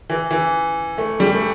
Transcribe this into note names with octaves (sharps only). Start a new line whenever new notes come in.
E3
E3
A3
G3
A3